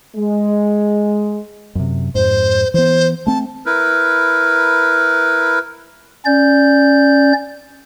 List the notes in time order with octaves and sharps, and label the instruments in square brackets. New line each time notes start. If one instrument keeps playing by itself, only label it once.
[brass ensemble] G#3
[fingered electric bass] F#2 C3
[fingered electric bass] F2 G#2 [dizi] C5
[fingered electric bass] E3 B3 [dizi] C5
[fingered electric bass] A3 C4 [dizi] A5
[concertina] E4 A#4 B4
[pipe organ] C#4 D5 G6